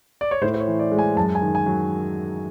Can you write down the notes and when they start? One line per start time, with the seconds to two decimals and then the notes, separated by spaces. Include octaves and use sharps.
0.21 D5
0.31 C#5
0.42 A2 C5
0.54 C5
0.60 C#5
0.67 E3
0.79 D5
0.92 G#3
0.99 G#5
1.16 F#2 A5
1.35 G#5
1.42 D#3
1.55 G#5
1.66 F#3